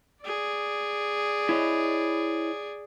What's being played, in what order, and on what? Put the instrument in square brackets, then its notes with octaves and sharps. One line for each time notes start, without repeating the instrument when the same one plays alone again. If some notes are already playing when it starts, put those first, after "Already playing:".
[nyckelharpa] G#4 D5
[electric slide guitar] E4 C#5 D#5